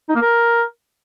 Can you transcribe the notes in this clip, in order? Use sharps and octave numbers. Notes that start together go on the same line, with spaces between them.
D#4
A#3
A#4